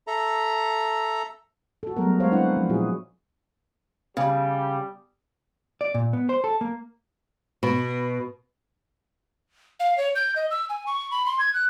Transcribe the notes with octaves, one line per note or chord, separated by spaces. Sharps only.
A4 E5 A#5
F#4 A4
F#3 G3 A3 B3 G#4 A#4
G#3 C5 C#5 F5
C4 D4 E4 B4 F#5
F3
A#2 E4 F#4 G#4
C#3 G3
D5
A#2
B3
C5
A4
A#3
B2
F5
C#5
G6
D#5
E6
G#5
C#6
B5
C6
G#6
F#6